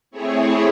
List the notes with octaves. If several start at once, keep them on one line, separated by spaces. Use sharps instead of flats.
A3 C4 E4 G#4 C#5